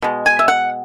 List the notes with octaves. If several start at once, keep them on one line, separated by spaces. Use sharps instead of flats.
B2 G#3
G#5
E5
F#5